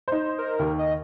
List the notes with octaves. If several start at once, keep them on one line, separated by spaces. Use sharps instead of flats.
D#4 C5
A#4
D#2
D#5